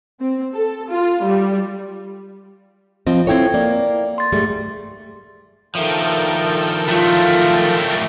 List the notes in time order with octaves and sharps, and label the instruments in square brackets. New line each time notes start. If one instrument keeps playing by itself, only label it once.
[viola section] C4
A4
F4
G3
[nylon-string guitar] F3 C4 D#5 [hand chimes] F4
[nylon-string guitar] C4 E4 C#5 [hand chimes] A4 G5 G#6
[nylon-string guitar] A#3 [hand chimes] D5
[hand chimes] C6 A6
[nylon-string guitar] G#2 G3 A3 [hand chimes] G#4
[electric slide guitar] D#3 F3 [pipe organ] A4 A#4 G5 [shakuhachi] E5
[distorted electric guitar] F#3 A3 [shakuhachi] F4